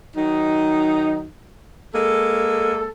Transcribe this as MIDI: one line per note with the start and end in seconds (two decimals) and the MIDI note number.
0.17 1.25 51
0.17 1.25 54
0.17 1.25 63
1.95 2.88 56
1.95 2.88 58
1.95 2.88 69